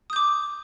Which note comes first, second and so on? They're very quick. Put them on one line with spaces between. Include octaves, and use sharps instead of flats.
D#6 G6 D6